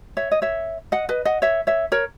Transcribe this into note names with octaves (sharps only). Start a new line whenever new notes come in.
C#5 E5
D#5
C#5 E5
D#5 F#5
B4 D#5
D#5 F#5
C#5 E5
C#5 E5
A#4 C#5